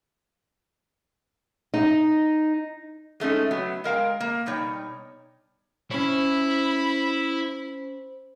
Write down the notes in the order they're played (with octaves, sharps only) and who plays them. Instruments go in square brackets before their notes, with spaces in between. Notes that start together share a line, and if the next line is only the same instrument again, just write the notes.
[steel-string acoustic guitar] D#4
[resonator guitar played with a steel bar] G#3 A3 C#4 D#4
F#3 B3
G#3 A#4 F5 G5
A#3
B2 G3 D#4 C#5 G5
[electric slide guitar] C#4 C#5 [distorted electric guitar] E4 [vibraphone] C5 [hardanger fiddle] B5